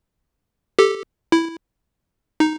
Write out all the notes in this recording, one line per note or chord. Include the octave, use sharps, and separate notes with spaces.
G4 A4
E4
D#4